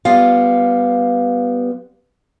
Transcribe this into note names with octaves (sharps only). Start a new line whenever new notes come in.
G3 B3 F4 F5